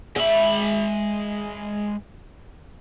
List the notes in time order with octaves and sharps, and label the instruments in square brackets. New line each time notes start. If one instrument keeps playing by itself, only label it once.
[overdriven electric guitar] G#3 B5 [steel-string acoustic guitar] E5